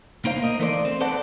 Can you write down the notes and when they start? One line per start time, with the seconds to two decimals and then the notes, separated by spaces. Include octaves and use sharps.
0.25 A#3 D#4 C5 F5
0.40 A#3 A#4 D#5
0.59 E3 A3 D#4 A4 C5 D5
0.85 C4
1.01 A4 B4 C5 D5 F#5 A5